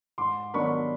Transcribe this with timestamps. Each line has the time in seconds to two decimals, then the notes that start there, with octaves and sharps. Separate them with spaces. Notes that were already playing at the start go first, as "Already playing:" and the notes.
0.18 G#2 C6 D6
0.54 D#3 F#3 B3 D4 B5 C#6